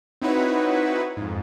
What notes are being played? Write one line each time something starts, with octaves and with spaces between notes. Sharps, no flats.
C4 D#4 E4 F#4 B4 C#5
F2 G#2